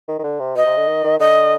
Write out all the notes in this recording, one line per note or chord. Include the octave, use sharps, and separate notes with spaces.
D#3
D#3
D3
C3
B2 D#5
C3
D3
D#3
D#3
D3 D#5